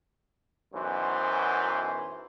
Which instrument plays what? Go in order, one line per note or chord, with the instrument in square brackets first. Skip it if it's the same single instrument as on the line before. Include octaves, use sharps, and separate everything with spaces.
[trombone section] B1 F#2 E3 C5